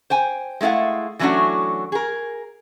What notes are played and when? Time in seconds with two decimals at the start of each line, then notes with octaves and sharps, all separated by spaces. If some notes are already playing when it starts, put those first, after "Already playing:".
0.10 C5 G5 G#5
0.61 G#3 A3 E4 F5 F#5
1.19 E3 F#3 A3 C#4 D4 F#4
1.92 G#4 A#4